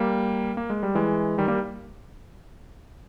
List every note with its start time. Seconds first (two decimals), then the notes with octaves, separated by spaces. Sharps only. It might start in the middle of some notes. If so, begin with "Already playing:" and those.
Already playing: G3 A#3
0.57 A#3
0.70 G#3
0.83 G3
0.95 E3 G#3
1.38 D#3 G3
1.48 G3 A#3